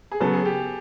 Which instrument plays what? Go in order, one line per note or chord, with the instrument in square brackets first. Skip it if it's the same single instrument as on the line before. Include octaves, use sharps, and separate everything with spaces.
[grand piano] G#4
[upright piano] C#3 F#3 B3 [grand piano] A4
[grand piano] G#4
G4